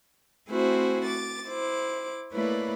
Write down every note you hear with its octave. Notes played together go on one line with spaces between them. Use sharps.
A3 C4 E4 F#4 G#4 C5
D6 A6
E4 C5 D6
A3 A#3 E4 B4 C#5 D5